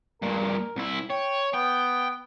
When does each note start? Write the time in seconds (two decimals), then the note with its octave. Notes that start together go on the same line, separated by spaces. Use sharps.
0.22 G2 A#2 A#4
0.76 C2 E4
1.10 C#5 G5
1.53 B3 G5